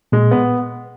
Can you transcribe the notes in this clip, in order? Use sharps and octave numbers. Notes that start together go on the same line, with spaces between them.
A#2 G#3
B3